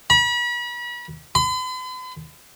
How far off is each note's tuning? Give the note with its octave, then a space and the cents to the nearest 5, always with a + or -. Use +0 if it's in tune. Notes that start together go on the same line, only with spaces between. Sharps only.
B5 -40
B5 +45